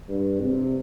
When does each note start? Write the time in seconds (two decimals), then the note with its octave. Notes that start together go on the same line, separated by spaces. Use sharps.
0.09 G2
0.41 C3